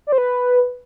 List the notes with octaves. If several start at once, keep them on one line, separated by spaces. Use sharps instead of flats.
D5
C5
B4